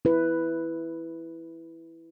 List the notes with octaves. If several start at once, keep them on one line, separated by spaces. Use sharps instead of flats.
E4 B4